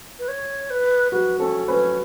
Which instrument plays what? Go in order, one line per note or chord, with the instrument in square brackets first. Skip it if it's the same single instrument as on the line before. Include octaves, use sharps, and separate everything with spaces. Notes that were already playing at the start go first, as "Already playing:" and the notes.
[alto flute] B4
C#5
B4
[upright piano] F#4 [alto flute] B4
[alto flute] C#4 [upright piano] A4
[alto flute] C#4 [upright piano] B4